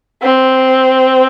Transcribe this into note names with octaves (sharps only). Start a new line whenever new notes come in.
C4